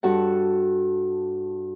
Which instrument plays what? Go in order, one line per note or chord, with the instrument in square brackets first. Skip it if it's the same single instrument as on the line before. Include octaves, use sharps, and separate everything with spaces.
[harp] G2 F#4 A4 F#5